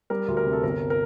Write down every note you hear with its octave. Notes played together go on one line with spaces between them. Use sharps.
G3 A#4
D2
A#4
C3
A4
G1 A#4
A#4